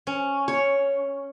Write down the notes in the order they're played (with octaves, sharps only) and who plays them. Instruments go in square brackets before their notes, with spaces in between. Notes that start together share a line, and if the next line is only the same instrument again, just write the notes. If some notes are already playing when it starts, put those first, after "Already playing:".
[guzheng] C#4
[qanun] C#5